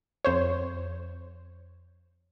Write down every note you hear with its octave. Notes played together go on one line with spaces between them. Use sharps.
F2 C5 C#5